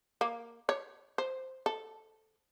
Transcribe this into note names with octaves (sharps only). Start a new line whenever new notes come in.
A#3
C#5
C5
A4